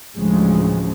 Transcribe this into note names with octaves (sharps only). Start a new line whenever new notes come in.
A1 D2 A2 C#3 F3 G#3